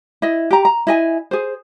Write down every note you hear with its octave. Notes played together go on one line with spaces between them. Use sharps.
E4 D#5
G4 A#5
A#5
E4 D#5 G#5
G#4 C5